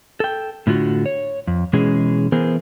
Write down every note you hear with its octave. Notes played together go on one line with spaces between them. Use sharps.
A4 G5
A2 D3 F4 F#4
C#5
F2
B2 E3 G#3 C#4 G#4
E3 B3 G#4 A#4 C5